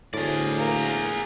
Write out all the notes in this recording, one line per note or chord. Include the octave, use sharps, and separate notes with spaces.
D2 A2 G#4 D5
A#3 A#4